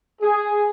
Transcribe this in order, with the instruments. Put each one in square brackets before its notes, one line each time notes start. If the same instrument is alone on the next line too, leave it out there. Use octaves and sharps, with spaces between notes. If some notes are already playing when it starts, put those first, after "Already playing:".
[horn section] G#4